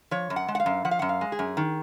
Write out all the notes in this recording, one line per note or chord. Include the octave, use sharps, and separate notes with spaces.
F3 C#5
F#2
F#5
G#3
F#5
F5
F#2
F3 F#5
F5
F#2 F#5
F5
G#3
G#4
F#2
D#3